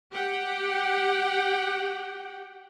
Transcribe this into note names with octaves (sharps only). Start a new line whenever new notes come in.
G4 F#5 G5